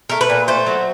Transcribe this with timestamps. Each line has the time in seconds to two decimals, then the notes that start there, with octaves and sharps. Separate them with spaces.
0.10 A3 A#4
0.21 B4
0.30 A#2
0.48 A3 C5
0.66 F#3